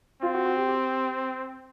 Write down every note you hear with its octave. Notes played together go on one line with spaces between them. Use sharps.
C4 F4
F#4
F#4
G4
G4